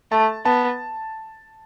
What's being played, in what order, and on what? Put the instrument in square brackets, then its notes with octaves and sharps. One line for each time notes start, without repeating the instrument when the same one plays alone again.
[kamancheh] A3 [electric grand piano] A5
[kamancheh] B3 [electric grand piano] A5